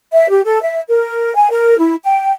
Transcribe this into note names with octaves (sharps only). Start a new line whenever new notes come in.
E5
G4
A4
E5
A#4
G#5
A#4
E4
G5